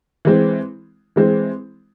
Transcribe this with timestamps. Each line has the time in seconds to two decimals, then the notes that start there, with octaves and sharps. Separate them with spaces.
0.25 E3 G#3 C4
1.16 E3 G#3 C4